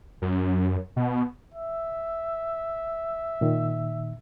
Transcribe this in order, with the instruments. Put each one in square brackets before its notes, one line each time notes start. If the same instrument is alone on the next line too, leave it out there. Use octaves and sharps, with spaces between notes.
[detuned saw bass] F#2
B2
[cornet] E5
[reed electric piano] A#2 D#3